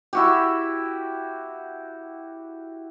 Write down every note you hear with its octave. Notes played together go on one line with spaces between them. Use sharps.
E4 F#4 G4